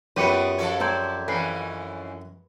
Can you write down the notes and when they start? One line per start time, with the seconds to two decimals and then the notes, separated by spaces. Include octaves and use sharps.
0.17 F#2 B3 C4 F4 G4 B4 C#7 D#7
0.58 F3 A4 C#5
0.80 C4 C5 D5 A#5 G6 G#6
1.28 F2 E3 C#4 A4 B4 C7